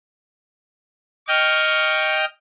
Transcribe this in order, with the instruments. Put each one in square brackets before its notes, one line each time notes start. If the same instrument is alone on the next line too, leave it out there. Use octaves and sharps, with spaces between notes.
[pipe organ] D#5 G5 F6 [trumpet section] C#6